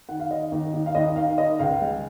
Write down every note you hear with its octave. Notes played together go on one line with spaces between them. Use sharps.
D#3 F#5
F5
D#3 D#5
D#2
D#2
F5
D#2 D#5
D#3 F5
D#3 D#5
C#2 F5
G#3